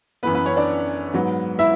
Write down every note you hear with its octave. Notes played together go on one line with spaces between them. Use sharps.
F#2 E3 B3 B4
B3 B4
C#4 C#5
D4 D5
G#2 F#3 B3
E4 E5